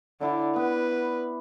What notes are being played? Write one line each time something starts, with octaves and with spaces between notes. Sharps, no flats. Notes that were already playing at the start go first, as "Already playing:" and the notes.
D3 E4 D5
B3 B4